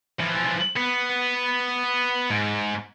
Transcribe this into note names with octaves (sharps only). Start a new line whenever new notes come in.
E3 F3
B3
G#2